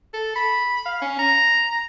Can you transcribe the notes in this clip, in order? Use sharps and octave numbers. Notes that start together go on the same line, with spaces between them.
A4
B5
F5
C#4
A#5